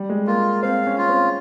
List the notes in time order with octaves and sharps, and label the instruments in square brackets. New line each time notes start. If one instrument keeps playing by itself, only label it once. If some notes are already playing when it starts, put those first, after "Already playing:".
Already playing: [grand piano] G3
G#3
[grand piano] A#3 [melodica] F4
[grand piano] C4 [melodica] F5
[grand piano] C#4
[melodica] F4
[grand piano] C4